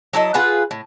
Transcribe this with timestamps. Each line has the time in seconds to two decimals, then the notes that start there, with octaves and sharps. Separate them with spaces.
0.13 F#3 E4 A4 D#5
0.34 F4 G#4 B4 F#5
0.71 A2